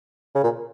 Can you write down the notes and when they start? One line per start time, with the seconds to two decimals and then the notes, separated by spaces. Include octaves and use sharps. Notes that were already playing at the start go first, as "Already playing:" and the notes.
0.35 C#3
0.43 A#2